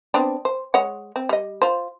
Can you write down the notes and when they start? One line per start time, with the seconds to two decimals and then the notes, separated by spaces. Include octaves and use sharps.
0.14 B3 C4 D4
0.45 C5
0.74 G#3 C#5 F#5
1.16 C4
1.29 G3 D#5
1.62 F4 C5